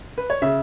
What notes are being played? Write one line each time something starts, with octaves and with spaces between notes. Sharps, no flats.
B4
C#5
C#3 E5